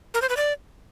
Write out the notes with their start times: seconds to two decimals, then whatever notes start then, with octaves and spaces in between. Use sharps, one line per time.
0.14 A#4
0.22 C5
0.29 B4
0.37 D5